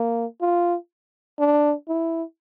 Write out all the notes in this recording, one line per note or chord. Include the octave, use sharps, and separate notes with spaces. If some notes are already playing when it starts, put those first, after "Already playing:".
Already playing: A#3
F4
D4
E4